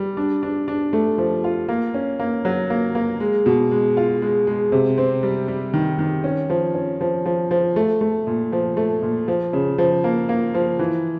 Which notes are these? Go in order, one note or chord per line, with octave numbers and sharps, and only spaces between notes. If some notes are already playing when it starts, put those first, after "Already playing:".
Already playing: G3
D4
D4
D4
A3
F3
F4
A#3
C#4
A#3
F#3
A#3
A#3
G#3
B2
G#3
F4
G#3
G#3
C3
C4
G3
G3
D#3
D#3
C#4
F3
C#4
F3
F3
F3
A3
A3
A#2
F3
A3
A#2
F3
C#3
F3
A#3
A#3
F3
E3